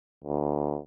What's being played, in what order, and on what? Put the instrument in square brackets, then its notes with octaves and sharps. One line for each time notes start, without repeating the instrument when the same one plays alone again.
[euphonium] D2